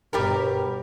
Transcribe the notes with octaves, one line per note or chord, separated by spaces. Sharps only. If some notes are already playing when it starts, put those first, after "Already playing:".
G1 B2 G3 G4 A#4